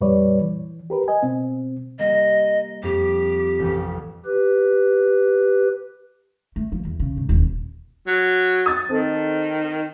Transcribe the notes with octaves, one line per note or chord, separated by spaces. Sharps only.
F2 A#2 G3 B4 C#5 D5
E3
G4 A#4 B4
D#5 G#5
B2 C4
G3 A#3 D#5
F2 G4
A1 F2
G4 B4
A3
F3
E2
C#3
G#2
D#1
F#3
D#6 A6
D#3 C4 A4